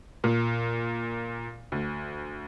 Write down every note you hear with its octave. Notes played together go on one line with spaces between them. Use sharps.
A#2
D2